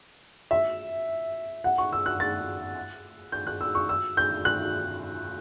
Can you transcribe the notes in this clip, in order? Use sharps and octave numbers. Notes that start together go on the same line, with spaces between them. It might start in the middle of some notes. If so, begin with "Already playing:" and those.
E5
F#5
C#6
E6
F#6
A6
G6
F#6
E6
C#6
E6
G6
F#6